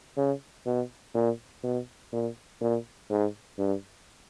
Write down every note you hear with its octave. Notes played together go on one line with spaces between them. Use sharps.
C#3
B2
A#2
B2
A#2
A#2
G#2
G2